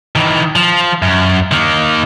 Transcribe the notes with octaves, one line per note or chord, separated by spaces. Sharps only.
D#3 E3
F3
F#2
D#3 A#3